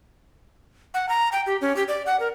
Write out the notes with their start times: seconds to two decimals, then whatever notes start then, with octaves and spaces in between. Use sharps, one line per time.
0.94 F#5
1.09 A#5
1.32 G5
1.47 G4
1.61 C#4
1.76 G4
1.88 D5
2.06 F#5
2.20 A#4